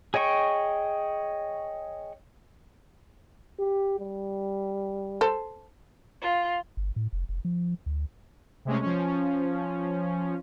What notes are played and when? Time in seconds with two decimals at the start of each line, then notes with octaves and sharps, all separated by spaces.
0.14 G#4 C#5 D#5 G5 C#6
3.59 G4
4.00 G3
5.21 A4 C5
6.22 F4
6.77 G1
6.96 A2
7.13 F1
7.29 F1
7.45 F3
7.86 D2
8.65 C3 G#3 A3 C#4
8.82 F3 C#4